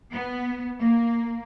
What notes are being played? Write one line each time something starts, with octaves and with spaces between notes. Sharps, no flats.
B3
A#3